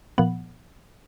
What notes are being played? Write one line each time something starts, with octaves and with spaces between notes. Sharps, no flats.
A#2 F3 B3 F#5